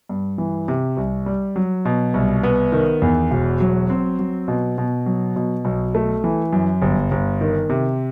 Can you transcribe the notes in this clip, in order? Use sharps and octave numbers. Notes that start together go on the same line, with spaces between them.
G2
E3
C3
C2
G3
F#3
B2
C2
B3
D#3
E2
E1
F#3
C4
F#3
B2
B2
F#3
B2
B1
A3
E3
F#2
G1
G1
D#3
C3